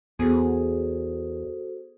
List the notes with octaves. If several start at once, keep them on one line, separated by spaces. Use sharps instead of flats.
E2 B3 F#4 G#4 A4 C5